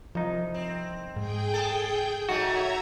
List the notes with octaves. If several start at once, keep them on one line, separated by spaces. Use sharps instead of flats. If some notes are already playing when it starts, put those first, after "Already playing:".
C2 F3 D#4
C4
G#2 G#4 G5 G6
A4
F#3 A3 D#4 F#4 E5 A#5 G#6